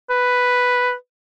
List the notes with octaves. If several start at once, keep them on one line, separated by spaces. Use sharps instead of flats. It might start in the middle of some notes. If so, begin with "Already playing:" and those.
B4